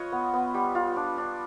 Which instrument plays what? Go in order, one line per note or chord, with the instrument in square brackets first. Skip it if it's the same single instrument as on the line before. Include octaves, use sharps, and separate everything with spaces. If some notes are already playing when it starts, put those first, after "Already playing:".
Already playing: [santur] F4 B4 C#5 D#5
B3
B3
G3
F4
D4
D4